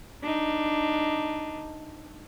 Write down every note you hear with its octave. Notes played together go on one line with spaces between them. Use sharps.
D4 D#4